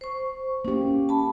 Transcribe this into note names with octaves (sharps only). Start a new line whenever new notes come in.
C5 C#6
A#3 C#4 G4
A5 B5